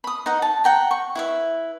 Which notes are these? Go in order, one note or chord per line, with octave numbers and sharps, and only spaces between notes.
B5 D#6
D#4 B4 F#5
A5
F#5 G5 A#5
C#6
E4 B4 E5